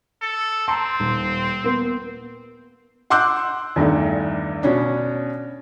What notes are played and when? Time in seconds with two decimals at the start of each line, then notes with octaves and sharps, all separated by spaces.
0.22 A4
0.68 C4 A5 A#5 C6
1.00 D#1
1.64 A#3 B3 A#4
3.10 F#5 C6 D6 E6 F#6 G6
3.76 E2 G2 D#3 A3
4.63 B2 C#4 D4